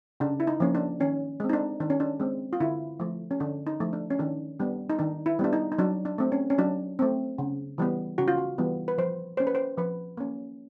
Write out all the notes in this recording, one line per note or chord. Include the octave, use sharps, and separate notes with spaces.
C#3 D4
E4
D#4
F3 A#3 C#4
D4
D#3 C#4
G#3 C4
D#4
D4
D#3 D4
C#4
D4
G#3 C4
F4
D3 E4
F3 A3
C#4
D3 D4
D#4
F3 A3
D4
C#4
D#3 D4
G3 B3 D4
D#4
D#3 D4
E4
G3 B3 D4
D#4
D#4
F#3 D4
D4
A3 C4
C#4
C#4
F#3 D4
A3 C4
C#3
E3 G3 B3
C#3 F#4
F4
F#4
E3 G3 B3
B4
F3 C5
A#3 C#4 C5
B4
C5
F3 B4
A#3 C#4